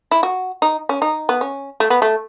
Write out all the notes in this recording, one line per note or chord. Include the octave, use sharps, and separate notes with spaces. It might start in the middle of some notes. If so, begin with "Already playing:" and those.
E4
F#4
D#4
C#4
D#4
B3
C#4
A3
B3
A3